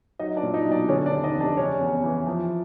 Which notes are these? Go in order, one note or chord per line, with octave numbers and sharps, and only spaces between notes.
F#3 D#4 D#5
D4 D5
A#2
D#4 D#5
B1
D4 D5
D3 C#4 C#5
D4 D5
D#2
D#4 D#5
F1
D4 D5
C#3 C#4 C#5
E2
E3
F3